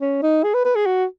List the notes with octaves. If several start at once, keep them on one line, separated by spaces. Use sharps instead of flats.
C#4
D#4
G#4
B4
B4
G#4
F#4